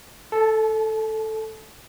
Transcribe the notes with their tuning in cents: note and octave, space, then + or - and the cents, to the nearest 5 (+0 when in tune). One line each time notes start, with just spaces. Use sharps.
A4 +0 A5 -35